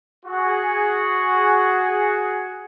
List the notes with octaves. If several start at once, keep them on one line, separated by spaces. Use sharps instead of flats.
F#4 G#4